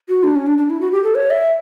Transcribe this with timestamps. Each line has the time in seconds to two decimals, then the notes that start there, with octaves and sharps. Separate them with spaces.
0.09 F#4
0.23 D4
0.36 C#4
0.47 D4
0.58 D4
0.70 E4
0.81 F#4
0.92 G4
1.04 A4
1.15 C#5
1.30 E5